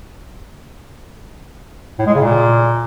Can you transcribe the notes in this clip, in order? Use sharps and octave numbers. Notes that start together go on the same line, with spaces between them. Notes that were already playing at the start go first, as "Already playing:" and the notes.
A2
G#3
C#3
A#2